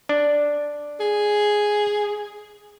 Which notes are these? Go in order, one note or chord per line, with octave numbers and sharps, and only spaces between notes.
D4
G#4